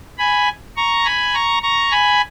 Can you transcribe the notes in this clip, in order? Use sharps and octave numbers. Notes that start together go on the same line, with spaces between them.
G#5 B5
A#5 C#6
G#5 B5
A#5 C#6
A#5 C#6
G#5 B5